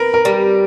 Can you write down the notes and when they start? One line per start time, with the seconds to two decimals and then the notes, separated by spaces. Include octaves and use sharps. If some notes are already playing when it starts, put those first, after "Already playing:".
Already playing: A#4 B4
0.14 A#4
0.25 G3